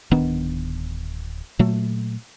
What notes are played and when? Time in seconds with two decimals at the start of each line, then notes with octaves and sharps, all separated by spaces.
0.11 D1 D#3 B3 D4
1.59 A#2 F#3 A3